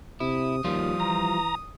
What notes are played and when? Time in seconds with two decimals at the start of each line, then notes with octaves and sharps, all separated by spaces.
0.20 C3 E4 D#6
0.64 D#2 F3 G3 F4
1.00 E3 A#5